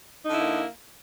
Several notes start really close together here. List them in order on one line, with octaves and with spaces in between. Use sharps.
D#4 D3 E4 A#3